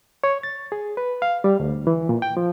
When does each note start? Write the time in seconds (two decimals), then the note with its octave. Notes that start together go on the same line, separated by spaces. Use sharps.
0.24 C#5
0.43 A6
0.72 G#4
0.97 B4
1.22 F5
1.44 G3
1.60 D2
1.87 E3
2.09 A#2
2.22 G5
2.37 F3